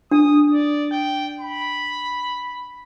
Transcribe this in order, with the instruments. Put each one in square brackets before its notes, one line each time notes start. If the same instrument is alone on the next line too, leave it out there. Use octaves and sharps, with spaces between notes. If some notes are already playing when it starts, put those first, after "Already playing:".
[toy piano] D4 [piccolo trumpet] D#6
[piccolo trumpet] D5
G5
B5